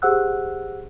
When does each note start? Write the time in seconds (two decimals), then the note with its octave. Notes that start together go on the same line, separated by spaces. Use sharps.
0.02 G4 G#4 C5 F#5 E6 F#6